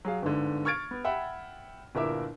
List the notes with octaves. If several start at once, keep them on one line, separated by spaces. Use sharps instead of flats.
F#3 G#4 F5
G1 G#2 D3
C#6 F6 G#6 A6 D7
B3
E5 F#5 G5 B5
G1 A#2 E4 A#4 E5 D6